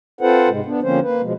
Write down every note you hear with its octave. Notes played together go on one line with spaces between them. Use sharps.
C4 F4 A4 B4 C5 F#5
G#2 C3 G#3
B3 D4
D3 F3 A#3 C4 C#4 C5
A#3 B4
B2 F3 G#3